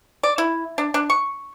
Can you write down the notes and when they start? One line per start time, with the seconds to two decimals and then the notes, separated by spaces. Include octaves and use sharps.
0.23 D5
0.38 E4
0.78 D4
0.94 D4
1.10 C#6